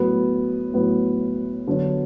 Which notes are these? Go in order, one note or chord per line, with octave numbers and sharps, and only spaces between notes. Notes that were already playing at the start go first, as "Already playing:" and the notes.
Already playing: A2 F#3 B3
A2 F#3 B3
D3 F#3 B3 F#4 C#5